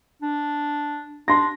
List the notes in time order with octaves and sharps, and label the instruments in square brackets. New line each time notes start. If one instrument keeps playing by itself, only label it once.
[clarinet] D4
[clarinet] D4 [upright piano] C6 A#6